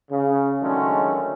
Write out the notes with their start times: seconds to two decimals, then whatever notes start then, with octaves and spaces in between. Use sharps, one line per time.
0.11 C#3
0.62 D3 D#3 F#3 G#3 A3 C#4